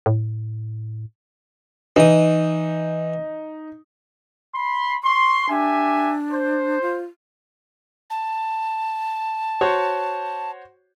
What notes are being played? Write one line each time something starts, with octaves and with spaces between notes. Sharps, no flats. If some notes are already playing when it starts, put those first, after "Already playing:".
A2
E3 D#4 D#6
B5 C6
C6 C#6
D4 G4 E5 G#5
C5
F4
A5
F#4 C5 C#5